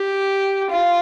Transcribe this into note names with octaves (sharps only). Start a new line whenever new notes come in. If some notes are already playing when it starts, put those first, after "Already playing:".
Already playing: G4
F4